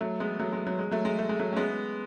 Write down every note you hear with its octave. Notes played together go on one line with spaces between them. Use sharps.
F#3 A3
G#3 B3
F#3 A3
G#3
F#3
G#3
F#3 A3
G#3
A3
G#3
F#3 A3
C#4
G#3 B3